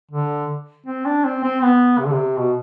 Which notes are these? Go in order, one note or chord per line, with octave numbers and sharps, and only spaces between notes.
D3
C4
D4
C4
C4
B3
C3
D3
C3
B2